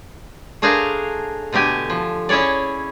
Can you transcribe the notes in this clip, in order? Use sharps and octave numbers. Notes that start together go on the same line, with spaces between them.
A3 D4 G#4 A#4 C5 F5
B2 D3 A3 G4 G#5
F3
C#4 E4 G#4 C#5 D5